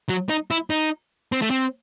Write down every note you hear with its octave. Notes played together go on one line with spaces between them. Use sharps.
F#3
D#4
E4
D#4
C4
A3
C4